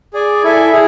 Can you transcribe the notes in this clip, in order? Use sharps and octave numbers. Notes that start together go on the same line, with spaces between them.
G#4 D5 G#5
E4 A4 E5 G#5
E4 G#4